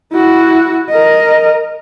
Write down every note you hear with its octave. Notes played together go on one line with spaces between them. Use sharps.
E4 F#4
A#4 D#5